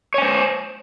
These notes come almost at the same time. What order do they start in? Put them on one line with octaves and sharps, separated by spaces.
C#5 G#5 C5